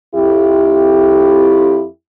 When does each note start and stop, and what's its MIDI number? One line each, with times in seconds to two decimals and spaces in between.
0.15 1.85 41
0.15 1.85 64
0.15 1.85 67